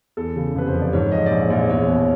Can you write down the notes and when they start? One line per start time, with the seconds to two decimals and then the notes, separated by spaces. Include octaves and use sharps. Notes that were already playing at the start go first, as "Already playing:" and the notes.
0.17 E2 A4
0.36 C#3
0.55 F1 B4
0.67 C5
0.74 F3
0.82 D5
0.93 G#2 C#5
1.12 F3 D#5
1.26 D5
1.31 A#1 C#5
1.50 A#1 D5
1.64 D5
1.70 E2 C#5
1.88 B2
1.96 C#5